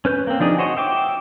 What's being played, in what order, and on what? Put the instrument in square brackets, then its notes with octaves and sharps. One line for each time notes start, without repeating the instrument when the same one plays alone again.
[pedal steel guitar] C#4 B4 G6
A#3 C4
F3 D4 D#4 G#4
F#4 C5 C#5 D#5
E5 G5 D6